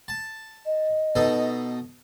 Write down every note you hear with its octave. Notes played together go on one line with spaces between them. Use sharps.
A5
D#5
B2 D#4 A4